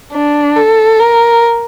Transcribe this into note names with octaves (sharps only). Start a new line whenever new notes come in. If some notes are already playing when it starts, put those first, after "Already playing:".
D4
A4
A#4